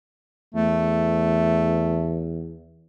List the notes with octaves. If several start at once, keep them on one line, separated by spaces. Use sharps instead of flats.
E2 A3